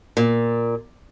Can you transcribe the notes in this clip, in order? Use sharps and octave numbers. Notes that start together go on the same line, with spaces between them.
A#2